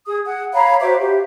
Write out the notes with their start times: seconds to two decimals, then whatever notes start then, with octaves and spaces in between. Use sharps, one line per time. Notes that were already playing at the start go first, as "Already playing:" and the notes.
0.07 G#4 D#6
0.25 F#5
0.54 C#5 F5 A#5 B5
0.81 F#4 C5 E5 D6
0.99 G4